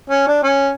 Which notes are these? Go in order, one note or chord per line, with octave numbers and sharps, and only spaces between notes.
C#4
D4
C#4